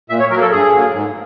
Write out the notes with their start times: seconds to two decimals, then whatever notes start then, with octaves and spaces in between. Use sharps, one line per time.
0.09 A#2 E5
0.20 C#5
0.30 F#3 A#4
0.35 A#3
0.41 A4
0.51 G2 G#4
0.72 D3 F#3 A#3
0.93 G#2